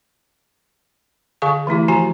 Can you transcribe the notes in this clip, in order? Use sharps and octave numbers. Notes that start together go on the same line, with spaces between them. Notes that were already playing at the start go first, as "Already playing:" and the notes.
D3 G#4 F5 C#6
E3 A3 E4 G4
F3 F#4 G#5 A#5